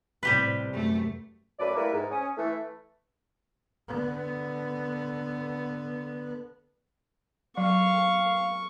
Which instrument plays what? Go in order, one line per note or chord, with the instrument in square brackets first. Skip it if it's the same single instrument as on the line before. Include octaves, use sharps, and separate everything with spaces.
[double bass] A2 C3 [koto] G3 G4 B4
[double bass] F#2 [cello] A3
[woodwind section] F#2 F#3 A3 B4 D5
G3 A3 A#3 E4 A#4 B4
G#2
C#4 D#6
E3 A3
[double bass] D3 B3
[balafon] F#3 [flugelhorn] F5 [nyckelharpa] C#6